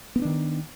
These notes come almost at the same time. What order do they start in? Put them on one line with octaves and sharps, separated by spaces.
B3 C#4 D4 D#3